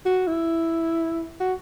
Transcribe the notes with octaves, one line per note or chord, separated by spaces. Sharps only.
F#4
E4
F#4